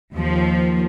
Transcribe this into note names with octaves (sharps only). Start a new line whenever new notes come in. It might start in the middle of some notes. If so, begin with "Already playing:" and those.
D#2 F3